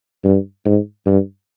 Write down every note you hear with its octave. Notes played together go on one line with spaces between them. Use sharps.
G2
G#2
G2